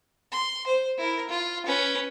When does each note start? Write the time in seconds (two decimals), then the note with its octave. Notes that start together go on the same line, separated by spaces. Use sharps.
0.32 C6
0.67 C5
0.98 E4 A#4
1.30 F4
1.66 C#4 B4